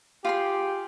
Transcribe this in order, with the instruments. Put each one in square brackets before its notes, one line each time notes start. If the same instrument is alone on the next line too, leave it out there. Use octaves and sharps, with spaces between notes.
[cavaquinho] F4 G#4 C6 [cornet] G4